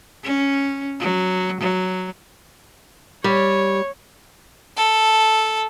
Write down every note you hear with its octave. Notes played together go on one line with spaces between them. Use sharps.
C#4
F#3
F#3
G3 C#5
A4